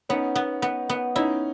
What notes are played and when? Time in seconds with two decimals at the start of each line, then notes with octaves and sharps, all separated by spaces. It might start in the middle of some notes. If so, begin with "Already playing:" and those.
0.09 B3 C#4 D#4
0.35 B3
0.62 B3
0.89 B3
1.15 C#4 D#4 E4